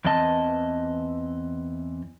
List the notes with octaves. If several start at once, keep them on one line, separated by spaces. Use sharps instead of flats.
E2 E3 C4 D#5 A5